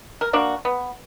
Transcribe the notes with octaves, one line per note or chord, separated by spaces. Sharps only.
A#4
A#3 D4 F#4
B3